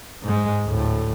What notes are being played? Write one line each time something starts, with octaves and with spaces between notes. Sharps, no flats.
G#2 G#3
D2 A2